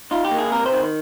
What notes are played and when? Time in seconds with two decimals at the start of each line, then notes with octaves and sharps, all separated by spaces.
0.11 D#4 F4
0.25 G4
0.31 A#3
0.39 G#4
0.52 C3 A#4
0.66 C5
0.72 D#3